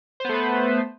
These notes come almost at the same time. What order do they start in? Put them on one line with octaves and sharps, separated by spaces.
C5 B3 A3 B4